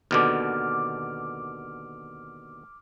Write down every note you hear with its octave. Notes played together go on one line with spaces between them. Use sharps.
D#2 B2 D3 D6 F6